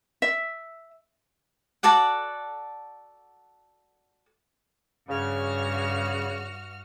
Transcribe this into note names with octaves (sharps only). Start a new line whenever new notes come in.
E5
F#4 A4 D5 F#5
G2 C#3 F#4 F6